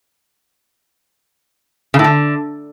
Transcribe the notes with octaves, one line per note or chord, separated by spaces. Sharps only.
C#3
A2
D3